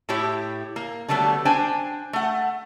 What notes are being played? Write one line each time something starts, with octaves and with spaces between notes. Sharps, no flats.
A2 E4 G4 C#5
A#3
D3 F#3 G3 A3 B3
D4 C5 G5 G#5
A3 F#5